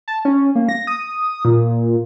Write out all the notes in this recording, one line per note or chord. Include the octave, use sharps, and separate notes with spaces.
A5
C#4
A#3
A#6
D#6
A#2